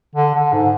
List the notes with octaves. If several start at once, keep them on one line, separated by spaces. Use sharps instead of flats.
D3
D3
G#2